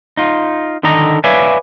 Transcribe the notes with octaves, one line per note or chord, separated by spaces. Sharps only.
D#4 F4
D3 D#3 A4 D#5 A#5
B4 C#5 D5 E5 F5 G#5